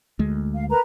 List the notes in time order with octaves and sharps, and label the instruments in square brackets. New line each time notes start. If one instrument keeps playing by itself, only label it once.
[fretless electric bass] D2 G#3
[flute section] F5
A#4 B4 A#5